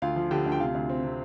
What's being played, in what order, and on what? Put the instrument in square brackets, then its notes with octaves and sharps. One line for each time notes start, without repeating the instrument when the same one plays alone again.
[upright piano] D2 F4 F5
F3
D3 G4 G5
D2
G5
C3 F4 F5
D2
C4
C3